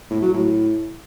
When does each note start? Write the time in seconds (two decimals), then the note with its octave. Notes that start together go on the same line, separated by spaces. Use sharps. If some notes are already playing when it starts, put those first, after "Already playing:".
0.10 A2
0.22 F#3
0.34 A2